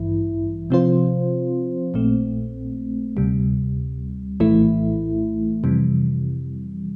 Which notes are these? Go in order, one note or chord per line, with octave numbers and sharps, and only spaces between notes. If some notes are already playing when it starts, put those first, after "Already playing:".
Already playing: A1 G2 E3 E4
C3 F3 C4 F4 C5
A#1 A#2 A3 C4
D2 C3 G3
A#1 A2 E3 A3 E4
F2 C3 E3 G3